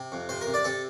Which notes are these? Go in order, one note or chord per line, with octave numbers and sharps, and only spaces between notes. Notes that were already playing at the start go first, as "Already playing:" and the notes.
Already playing: C3
F2
C3 C5
A#4
C3
D5
C3 A4